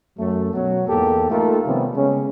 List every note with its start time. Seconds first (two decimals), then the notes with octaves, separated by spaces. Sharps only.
0.19 F#2 A3
0.54 B2 F#3
0.88 E2 G#2 A#3 G4 A4
1.31 A3 A#3 D#4 F4 A4 A#4
1.65 C3 D#3 F3 G3 B3 C#4
1.95 C#3 G#3 B3 C#4